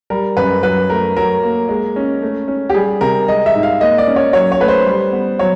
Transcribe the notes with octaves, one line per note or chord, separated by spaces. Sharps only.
G3 A#4
F#2 B4
F#3 B4
A3 A#4
F#3 A#4
A#3
G#3
C#4
A3
C#4
G4
G3 G#4
C3 A#4
G#3 D#5
E5
G#2
F5
A#3 D#5
D5
C#4
C#5
F#3 C#5
C#5
A3 B4
C5
G3
B3
F#3 C#5